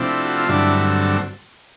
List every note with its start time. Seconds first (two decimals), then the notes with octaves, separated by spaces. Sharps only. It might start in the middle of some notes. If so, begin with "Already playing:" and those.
Already playing: C3 F3 A3 C4 D4 E4
0.25 F#4
0.37 F4
0.48 G2 D3 F#3 A3 C4 D4 E4